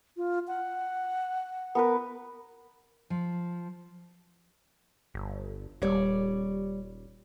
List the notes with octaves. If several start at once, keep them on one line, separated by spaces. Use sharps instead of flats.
F4
F#5
B3 A#4 B4
F3
G1
D#1 G3 C#5 D5